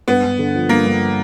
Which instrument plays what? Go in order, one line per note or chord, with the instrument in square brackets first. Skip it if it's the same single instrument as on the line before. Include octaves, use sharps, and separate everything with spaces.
[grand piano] G2 [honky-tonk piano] B3
[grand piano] G2
D3
F3
[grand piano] G2 [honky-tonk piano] A#3
[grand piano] G2